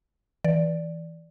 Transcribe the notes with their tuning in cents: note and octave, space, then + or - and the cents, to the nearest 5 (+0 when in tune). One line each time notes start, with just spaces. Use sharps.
E3 -5 D5 +0